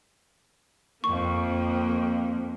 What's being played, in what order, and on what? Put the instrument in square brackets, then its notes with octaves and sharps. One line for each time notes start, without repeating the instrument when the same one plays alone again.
[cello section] F2 A#3 [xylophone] C#6